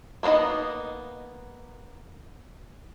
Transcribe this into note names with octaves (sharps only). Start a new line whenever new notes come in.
A#3 B3 D4 D#4 D#5